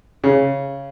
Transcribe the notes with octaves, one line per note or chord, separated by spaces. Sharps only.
C#3